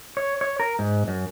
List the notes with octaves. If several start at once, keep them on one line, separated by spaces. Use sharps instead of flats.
C#5
C#5
A#4
G#2
F#2